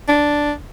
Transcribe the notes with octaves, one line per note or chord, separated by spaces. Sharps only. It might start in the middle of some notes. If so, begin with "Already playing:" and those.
D4